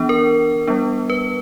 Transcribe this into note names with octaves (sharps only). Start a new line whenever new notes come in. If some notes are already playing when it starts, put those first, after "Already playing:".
Already playing: E3 B3 D4
A#4
G3 B3 D4
B4